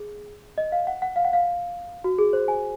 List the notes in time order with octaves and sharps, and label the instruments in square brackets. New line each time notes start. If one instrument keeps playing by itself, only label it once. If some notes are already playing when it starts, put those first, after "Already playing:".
Already playing: [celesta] G#4
D#5
F5
F#5
F#5
F5
F#5
F5
F#4
G#4
C5
G#5